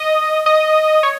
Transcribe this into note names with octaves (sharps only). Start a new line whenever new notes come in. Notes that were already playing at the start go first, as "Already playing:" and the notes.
Already playing: D#5
D#5
C#5